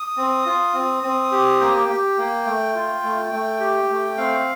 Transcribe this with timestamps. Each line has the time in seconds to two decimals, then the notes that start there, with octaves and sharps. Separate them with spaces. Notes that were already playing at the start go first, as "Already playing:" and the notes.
Already playing: D#6
0.17 C4
0.46 F4
0.74 C4
1.03 C4
1.32 G4
1.60 A#3 G5
1.89 G4
2.18 A#3
2.45 A3
2.74 F4
3.03 A3
3.32 A3
3.60 G4
3.89 A3
4.17 C4 F5